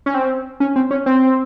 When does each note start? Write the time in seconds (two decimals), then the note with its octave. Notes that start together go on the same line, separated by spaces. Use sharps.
0.06 C#4
0.14 C4
0.60 C#4
0.76 C4
0.91 C#4
1.06 C4